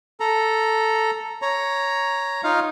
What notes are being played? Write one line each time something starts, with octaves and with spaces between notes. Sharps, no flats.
A4 A#5
C#5 A#5
D#4 F4 F5